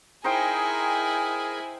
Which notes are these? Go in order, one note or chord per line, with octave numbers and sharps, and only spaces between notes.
D#4 E4 G#4 A#4 C5 G5 G#5